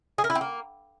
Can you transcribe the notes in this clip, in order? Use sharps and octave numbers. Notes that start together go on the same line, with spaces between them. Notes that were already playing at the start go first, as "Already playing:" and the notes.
G#4
A#4
E4
C4
A#3